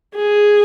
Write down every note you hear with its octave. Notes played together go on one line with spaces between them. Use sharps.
G#4